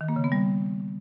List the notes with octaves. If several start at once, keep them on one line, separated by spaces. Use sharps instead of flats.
D#3
A#3
C#3
B3
G3